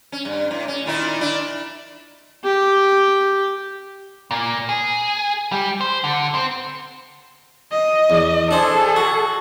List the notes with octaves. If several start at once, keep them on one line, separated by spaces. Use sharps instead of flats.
C#4
G2
A2
C#4
A#2 D#3 E4
D4 E4
G4
A#2
G#4
G3
C5
D3
C4
D#5
E2
D4 G#4 A4 C5
F#4